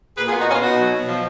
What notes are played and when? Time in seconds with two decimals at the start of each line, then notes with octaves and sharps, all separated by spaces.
0.16 A#2 G#4 B4
0.28 F4 G#4
0.32 B3
0.40 D#4 F#4
0.47 B3 C#4 F4
0.62 B2 D#4 F#4
0.77 F#3
0.93 B2
1.08 F3